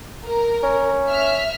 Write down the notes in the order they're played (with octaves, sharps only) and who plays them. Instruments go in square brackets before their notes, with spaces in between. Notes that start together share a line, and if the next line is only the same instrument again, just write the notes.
[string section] A#4
[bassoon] C#4
[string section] E5 F6